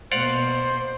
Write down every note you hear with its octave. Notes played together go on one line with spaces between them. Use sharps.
B2 A#3 C5 D5 F5 F#5